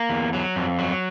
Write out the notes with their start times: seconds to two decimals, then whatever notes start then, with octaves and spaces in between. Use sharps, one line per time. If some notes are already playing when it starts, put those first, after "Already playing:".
Already playing: A#3
0.10 E2
0.33 F#3
0.56 F2
0.79 F#3